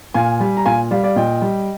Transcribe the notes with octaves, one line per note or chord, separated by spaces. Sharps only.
A#2 F5 G#5
G3
A#5
A#2 F5 G#5
G3 D5 F5
D5 F5
A#2 D#5 G5
G3